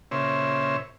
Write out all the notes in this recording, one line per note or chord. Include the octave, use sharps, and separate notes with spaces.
A#2 C#3 C5 C#5 E5